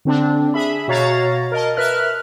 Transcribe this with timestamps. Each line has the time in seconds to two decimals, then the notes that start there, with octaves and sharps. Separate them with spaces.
0.05 D3 C4 D4
0.54 G#4 E5 B5
0.88 B2 F#4 C#5 F5 A#5 A6
1.52 A#4 D#5 A5
1.77 A#4 B4 E5 F6 F#6